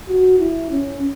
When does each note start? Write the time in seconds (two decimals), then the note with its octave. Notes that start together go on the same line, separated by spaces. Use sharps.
0.09 F#4
0.39 E4
0.71 C#4